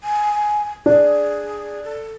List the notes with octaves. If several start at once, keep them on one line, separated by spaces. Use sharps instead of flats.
G#5
D4 G#4
A4